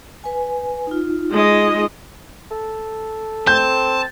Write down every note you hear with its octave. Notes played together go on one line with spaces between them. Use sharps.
B4 G#5
D#4 F4
G#3 D#5
A4
C4 A5 G6